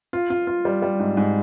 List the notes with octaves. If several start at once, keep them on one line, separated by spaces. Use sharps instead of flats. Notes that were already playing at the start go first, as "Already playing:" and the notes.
F4
F4
F4
G3
G3
G#2
G#2